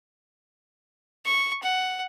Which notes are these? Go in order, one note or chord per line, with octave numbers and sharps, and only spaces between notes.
C#6
F#5